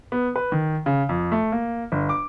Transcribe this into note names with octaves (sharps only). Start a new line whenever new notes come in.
B3
B4
D#3
C#3
F2
A3
A#3
G1
D6